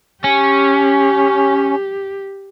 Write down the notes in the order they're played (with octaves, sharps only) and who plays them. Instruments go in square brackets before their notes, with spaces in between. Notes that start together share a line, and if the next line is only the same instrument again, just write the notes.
[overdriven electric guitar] C#4 [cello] G4